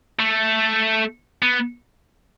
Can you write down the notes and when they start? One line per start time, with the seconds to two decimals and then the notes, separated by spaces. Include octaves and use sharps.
0.19 A3
1.43 B3